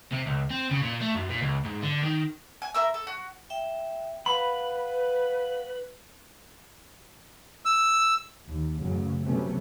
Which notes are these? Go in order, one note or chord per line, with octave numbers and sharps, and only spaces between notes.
C3
C#2
C4
C#3
A#2
A3
F#2
A#2
C#2
G#2
D3
D#3
G#5
E4 A#4 E6
A4
F#4
E5 G5
B4 F5 F#5 B5
E6
D#2
A1 F#2 C#3 F#3
C3 F#3 G3 A3 B3 C#4